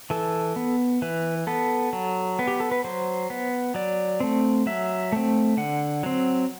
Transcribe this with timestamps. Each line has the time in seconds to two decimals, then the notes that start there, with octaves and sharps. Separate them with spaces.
0.10 E3 A4
0.56 B3
1.02 E3 B4
1.47 B3 A4
1.93 F#3
2.39 B3
2.48 G4
2.60 A4
2.72 B4
2.84 F#3 C5
3.30 B3
3.75 F#3 D5
4.20 A3 C4
4.66 F#3 E5
5.12 A3 C4
5.57 D3 F#5
6.03 F#3 C4